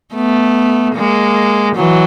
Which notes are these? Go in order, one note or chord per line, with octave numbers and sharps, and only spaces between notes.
A3 B3
G#3 A#3
E3 F#3